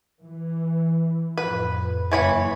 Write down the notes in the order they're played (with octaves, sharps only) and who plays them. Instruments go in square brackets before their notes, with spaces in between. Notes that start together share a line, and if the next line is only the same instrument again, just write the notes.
[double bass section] E3
[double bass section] F2 A2 [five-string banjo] B4
[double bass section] F#1 [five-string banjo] E3 C#5 B5